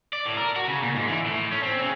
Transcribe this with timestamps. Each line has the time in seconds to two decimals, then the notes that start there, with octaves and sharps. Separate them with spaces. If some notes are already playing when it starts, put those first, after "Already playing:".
0.13 D5
0.25 A2
0.37 A#4
0.56 F#4
0.68 C#3
0.82 A#2
0.95 G#2
1.08 E3
1.26 A2
1.52 C#4
1.63 C4
1.81 C#3